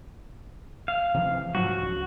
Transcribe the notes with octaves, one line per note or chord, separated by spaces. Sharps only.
F5
C3 E3 F3
G#2 F3 F#3 F#4
C#2